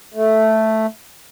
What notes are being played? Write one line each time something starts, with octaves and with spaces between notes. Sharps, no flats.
A3